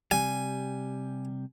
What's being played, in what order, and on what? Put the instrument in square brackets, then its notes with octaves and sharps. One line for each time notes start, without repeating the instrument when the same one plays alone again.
[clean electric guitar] C3 G3 [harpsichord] G#5